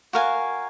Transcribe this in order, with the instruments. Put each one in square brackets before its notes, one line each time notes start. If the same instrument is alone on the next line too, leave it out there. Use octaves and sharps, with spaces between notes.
[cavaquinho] F#4 A#4 F5 G#5